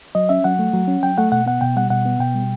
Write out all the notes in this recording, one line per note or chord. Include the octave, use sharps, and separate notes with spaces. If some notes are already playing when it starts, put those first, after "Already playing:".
F#3 D#5
C#4 E5
F#3 F#5
A3
F#3
C#4
F#3 G5
A3 F#5
B2 F#5
B3 F#5
B2 G5
G3 F#5
B2 F#5
B3
B2 G5
G3